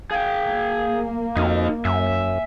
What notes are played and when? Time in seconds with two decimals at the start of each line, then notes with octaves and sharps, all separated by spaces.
0.11 G#4 F5 G5
0.46 A#3
1.37 F2 D#4 F#4 F5
1.85 F#2 E5 G#5